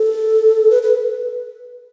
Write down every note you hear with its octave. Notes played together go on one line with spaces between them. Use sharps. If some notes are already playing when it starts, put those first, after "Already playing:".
Already playing: A4
B4
B4